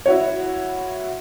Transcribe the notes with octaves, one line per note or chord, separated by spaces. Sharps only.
E4 F#4 C#5